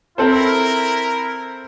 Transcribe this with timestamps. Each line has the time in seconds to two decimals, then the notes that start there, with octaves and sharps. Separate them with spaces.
0.18 C4 E4 A4 A#4 C5